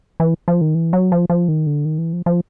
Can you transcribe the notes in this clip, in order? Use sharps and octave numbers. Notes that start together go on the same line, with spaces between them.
E3
F3
D#3
E3
F#3
F3
F3
D#3
D3
D#3
E3
F3
F3